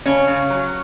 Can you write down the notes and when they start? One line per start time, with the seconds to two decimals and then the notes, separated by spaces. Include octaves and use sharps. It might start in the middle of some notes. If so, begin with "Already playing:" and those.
0.06 C#3 C#4
0.28 C#3
0.50 F#3